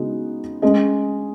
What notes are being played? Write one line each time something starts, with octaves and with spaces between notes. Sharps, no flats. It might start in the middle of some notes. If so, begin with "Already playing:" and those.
Already playing: C#3 G#3 B3 D#4 F#4
G#3 C#4 G#4 D#5